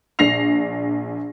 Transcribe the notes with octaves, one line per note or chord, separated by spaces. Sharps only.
A#1 D4 A#6 C7 F7